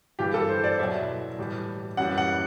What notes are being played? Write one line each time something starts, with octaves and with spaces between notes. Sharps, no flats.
G2 E3 G3 G4
A4
C5
D5
E2 B2 F#3 E5
A2 E3 G3
F#2 E3 G3 F#5
F#5